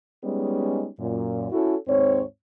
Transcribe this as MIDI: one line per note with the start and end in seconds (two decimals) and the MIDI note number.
0.24 0.88 55
0.24 0.88 56
0.24 0.88 59
0.24 0.88 61
0.24 0.88 63
0.99 1.48 42
0.99 1.48 46
1.52 1.76 61
1.52 1.76 64
1.52 1.76 66
1.52 1.76 69
1.88 2.22 39
1.88 2.22 44
1.88 2.22 60
1.88 2.22 73